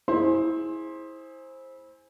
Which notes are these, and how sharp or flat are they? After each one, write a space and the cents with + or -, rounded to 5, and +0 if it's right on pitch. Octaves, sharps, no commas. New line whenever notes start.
E4 -20 G#4 +0 C5 +15